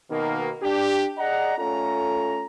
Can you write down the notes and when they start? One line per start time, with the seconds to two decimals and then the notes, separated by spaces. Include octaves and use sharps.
0.10 B2 D#3 A#3
0.62 D4 G4
1.18 G#4 D5 D#5 F#5 A#5
1.58 A3 C#4 F4 A4 A#5